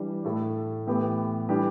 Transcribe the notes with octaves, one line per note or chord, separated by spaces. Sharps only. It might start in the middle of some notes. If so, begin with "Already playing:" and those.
Already playing: E3 G3 D4 G4
A2 A3 E4 A4
A2 E3 B3 G4
E3 G3 D4 G4